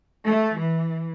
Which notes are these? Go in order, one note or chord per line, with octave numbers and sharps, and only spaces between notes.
A3
E3